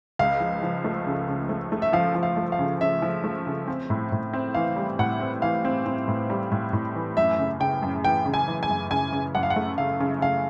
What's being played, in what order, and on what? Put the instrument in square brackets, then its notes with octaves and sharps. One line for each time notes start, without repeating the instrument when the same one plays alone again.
[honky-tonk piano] C#2 [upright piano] F5
[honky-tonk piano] F3
F3
A3
C#3
C#3
A3
A3
[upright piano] E5
[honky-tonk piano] F3 [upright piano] F5
[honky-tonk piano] F3
[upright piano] F5
[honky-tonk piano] A3
[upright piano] F5
[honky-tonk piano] C#3
[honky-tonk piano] C#3 [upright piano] E5
[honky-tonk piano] F3
A3
C#3
C4
A2
A2
C4
[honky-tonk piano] E3 [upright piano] F5
[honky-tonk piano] G3
[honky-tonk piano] A2 [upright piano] F#5
[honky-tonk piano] C4
[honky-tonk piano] E3 [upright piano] F5
[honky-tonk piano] C4
C4
A2
G3
A2
A2
E3
[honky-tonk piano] F#2 [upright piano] E5
[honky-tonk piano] C#3
[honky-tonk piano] C#3 [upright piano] G5
[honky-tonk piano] F#2
[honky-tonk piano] E3 [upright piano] G5
[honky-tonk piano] C#3
[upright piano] G#5
[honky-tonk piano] E3
[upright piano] G#5
[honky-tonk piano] F#2
[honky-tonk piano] C#3 [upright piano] G#5
[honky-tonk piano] C#3
[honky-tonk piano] F#2 [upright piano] F#5
[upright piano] F5
F#5
[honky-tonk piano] A3
[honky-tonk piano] C#3 [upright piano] F5
[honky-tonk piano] C#3
[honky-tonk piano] C#3 [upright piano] F5